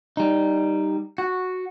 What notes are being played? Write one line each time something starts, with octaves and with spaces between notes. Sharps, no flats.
G3 D#4
F#4